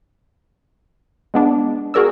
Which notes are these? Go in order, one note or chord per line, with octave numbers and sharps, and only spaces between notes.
G#3 B3 D4
F#4 G#4 A#4 D5 E6